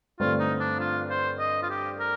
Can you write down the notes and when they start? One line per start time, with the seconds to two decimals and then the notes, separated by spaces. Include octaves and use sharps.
0.20 G2 D3 A3 C4 F4
0.39 D#4
0.60 D4
0.79 F4
1.09 C5
1.39 D#5
1.63 F4
1.70 G4
2.00 A#4